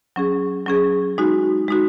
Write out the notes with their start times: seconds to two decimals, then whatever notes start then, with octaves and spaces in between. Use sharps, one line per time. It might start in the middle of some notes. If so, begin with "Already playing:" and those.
0.16 F#3 C#4 G#4
0.67 F#3 C#4 G#4
1.18 G#3 D#4 F#4
1.68 G#3 D#4 F#4